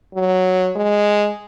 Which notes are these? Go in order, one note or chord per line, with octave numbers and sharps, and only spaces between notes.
F#3
G#3